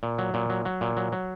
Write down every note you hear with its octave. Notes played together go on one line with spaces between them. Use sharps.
A#2
F#3
A#2
F#3
F#3
A#2
F#3
F#3